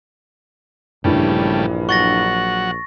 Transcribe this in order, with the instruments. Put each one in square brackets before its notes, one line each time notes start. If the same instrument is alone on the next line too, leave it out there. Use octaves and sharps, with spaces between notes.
[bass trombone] A#1 [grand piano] G2 E3 [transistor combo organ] C#3 G3 A3
[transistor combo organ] F#3 F#5 [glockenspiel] C#6 A6 A#6